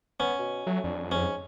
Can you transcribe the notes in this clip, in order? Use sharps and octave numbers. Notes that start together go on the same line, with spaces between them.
B3 C#4
B2
F#3 A3
F2 D4
G#2 C#4